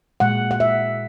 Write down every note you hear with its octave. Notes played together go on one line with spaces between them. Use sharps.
A#2 G#3 F#5
F#5
E5